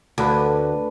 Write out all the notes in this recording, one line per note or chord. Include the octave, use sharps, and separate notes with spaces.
D2 D4 B4